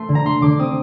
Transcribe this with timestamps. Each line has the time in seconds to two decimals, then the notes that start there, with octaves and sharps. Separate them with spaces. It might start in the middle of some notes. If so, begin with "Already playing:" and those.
Already playing: A3 C6
0.09 D3
0.15 A#5
0.26 A3 C6
0.42 D3 D6
0.59 C4 D#6